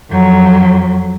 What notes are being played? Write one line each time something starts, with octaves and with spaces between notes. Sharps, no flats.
F2 F#3